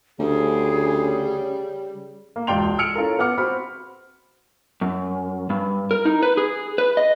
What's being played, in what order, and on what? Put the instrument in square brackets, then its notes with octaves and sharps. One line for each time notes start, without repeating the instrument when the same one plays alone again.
[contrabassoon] D2 [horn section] C#3 G3 [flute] G#4
[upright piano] A#3
E1 C#2 D5 G5 C6 F7
E6 F6 C#7 D7 F7
C#4 F4 A4 A#4
B3 F#5 D6 F6 C#7
C4 F#4 B5 F6
[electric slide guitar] F#2
G2
A#4
D#4
B4
G#4
B4
D#5